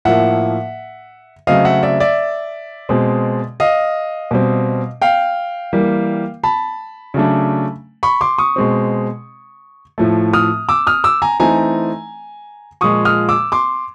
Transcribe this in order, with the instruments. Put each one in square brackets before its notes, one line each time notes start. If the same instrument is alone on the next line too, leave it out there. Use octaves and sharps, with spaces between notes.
[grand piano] A2 F3 A#3 E5 F#5
C#3 F#3 A3 C4 D#5 F5
E5 F#5
D5 E5
D5 E5
B2 G#3 C4
D#5 F5
B2 G3 C4
F5 G5
E3 G3 A#3
A5 B5
C#3 F#3 A3 D4
B5 C#6
C6 D6
C#6 D#6
B2 G#3 C4
A2 F3 A3
D#6 F6
D6 E6
D#6 F6
D6 E6
G#5 A#5
E3 A3 C4 D#4 G#5 A#5
A#2 F3 G#3 C#6 D#6
D#6 F6
D6 E6
C6 D6